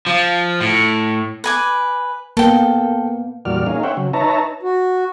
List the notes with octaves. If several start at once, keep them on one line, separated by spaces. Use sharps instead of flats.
F3
A2
B4 G#5 D6
A#3 B3 A4 G5
E2 A#2 G3 F#4 D5 F6
A#3 C#4 D#4 G#4 F5
C5 C#5 E5 F#5 G5
C#3 F#3
D#4 B4 C#5 E5 A5 A#5
F#4